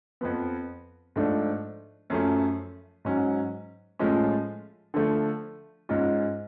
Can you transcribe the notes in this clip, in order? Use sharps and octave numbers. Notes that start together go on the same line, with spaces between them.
F2 F3 B3
G#2 F3 A3 D4
F#2 F3 A3 C#4
G#2 F#3 C#4
A2 F3 G#3 C#4 F4
D3 F3 A3
G#2 G#3 C#4 F4